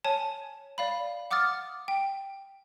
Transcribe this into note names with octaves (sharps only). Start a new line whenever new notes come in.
C#5 G#5 A5
D5 F5 B5
F#5 D6 D#6 F6 A6
G5